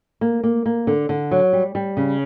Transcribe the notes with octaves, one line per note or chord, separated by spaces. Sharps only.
A#3
A#3
A#3
D3
D3
F#3
G3
G3
C#3